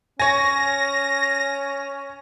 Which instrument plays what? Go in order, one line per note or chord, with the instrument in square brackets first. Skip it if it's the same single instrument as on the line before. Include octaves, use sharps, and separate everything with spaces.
[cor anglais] C#4 [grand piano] C#5 G#5 [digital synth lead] A#6